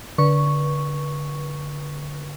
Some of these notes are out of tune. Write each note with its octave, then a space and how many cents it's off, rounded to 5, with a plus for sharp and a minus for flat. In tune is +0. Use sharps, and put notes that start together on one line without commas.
D3 -15 B4 -30 C#6 +0